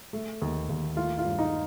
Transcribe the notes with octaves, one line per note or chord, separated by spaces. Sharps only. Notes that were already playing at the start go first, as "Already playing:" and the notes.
A3
D#2
D#2
A3 F4
F4
G2
D#4